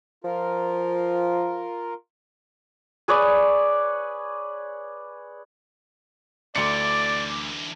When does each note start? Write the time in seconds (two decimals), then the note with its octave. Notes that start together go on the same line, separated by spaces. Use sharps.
0.24 F3 F4 A#4
3.08 G#4 B4 C#5 D5
6.56 D2 D3 E3 D5 C6 D6 C#7